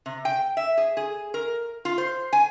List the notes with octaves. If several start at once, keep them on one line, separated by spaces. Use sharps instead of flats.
C3
G5
E5
G#4
G#4
A#4
F4
C5
G#5